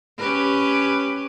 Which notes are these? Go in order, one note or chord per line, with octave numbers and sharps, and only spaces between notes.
C#4 G4 B4